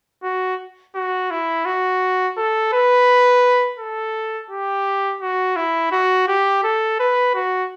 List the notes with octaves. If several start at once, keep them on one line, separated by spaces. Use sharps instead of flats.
F#4
F#4
E4
F#4
A4
B4
A4
G4
F#4
E4
F#4
G4
A4
B4
F#4